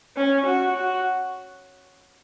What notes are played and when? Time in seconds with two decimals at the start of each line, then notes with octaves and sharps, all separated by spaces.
0.16 C#4
0.46 F#4
0.76 F#4